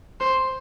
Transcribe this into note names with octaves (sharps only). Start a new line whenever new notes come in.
C5